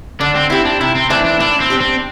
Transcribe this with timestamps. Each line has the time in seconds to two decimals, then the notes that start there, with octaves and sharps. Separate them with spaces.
0.20 D3 D4
0.35 C4
0.50 C4 E4 G4
0.65 D4
0.80 C3 E4
0.95 C4
1.10 E3 A3 C4 D4 E4
1.25 D4
1.40 A2 D4
1.60 C4
1.70 G3 D4 G4
1.80 C4